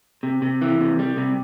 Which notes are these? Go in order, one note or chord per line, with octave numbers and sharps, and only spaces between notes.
C3
C3
E3
C3
G3
C3